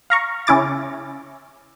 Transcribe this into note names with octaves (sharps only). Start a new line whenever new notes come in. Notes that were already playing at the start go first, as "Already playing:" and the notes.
F5 A#5 C#6
C#3 C#4 E4 D6 A6